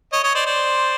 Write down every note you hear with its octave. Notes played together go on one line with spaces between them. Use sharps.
C#5 D#5
C#5 D#5
C5 D5
C5 D5